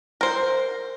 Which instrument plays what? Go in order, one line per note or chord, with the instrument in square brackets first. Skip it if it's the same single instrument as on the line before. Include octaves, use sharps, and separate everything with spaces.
[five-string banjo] A#4 C5